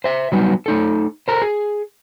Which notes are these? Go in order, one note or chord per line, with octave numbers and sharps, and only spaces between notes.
C5 E5
F#3 G3 B3 D#4
A3 D#4 A4
A4 A#4 C5
G#4